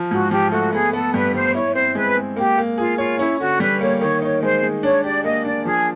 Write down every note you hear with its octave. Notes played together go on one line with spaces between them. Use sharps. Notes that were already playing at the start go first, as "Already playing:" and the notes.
Already playing: F3
G#2 F#4
F3 G4
A3 F#4
B3 G#4
B3 A4
G2 B4
G3 C5
E4 C#5
C4 C5
G#3 B4
G#3
A#3 G4
A#3
F4 G#4
F4 C#5
C#4 E4
D3 F#4
G3 B4
A#3 C#5
D#3 C#5
D#4 C#5
G#3 C5
G#3
D4 C#5
G4 D5
A#3 D#5
D4 D5
F3 G#4